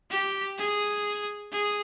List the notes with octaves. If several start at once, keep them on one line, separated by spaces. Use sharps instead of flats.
G4
G#4
G#4